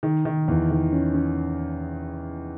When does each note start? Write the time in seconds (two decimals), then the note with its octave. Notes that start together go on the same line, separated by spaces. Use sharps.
0.03 D#3
0.25 D#3
0.48 E2
0.70 D#3
0.92 C#4
1.14 C#4